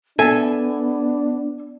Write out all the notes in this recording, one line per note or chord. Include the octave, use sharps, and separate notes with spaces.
B3 D4 A4 E5 G#5